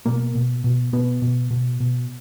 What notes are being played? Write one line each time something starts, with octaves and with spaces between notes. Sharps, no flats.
B2 A#3
B2
B2
B2 B3
B2
B2
B2